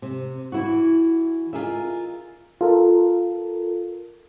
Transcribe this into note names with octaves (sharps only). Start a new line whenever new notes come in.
C3
E3 E4 F#4
F4 G#4 A#4 D#5 E5
F4 A4 A#4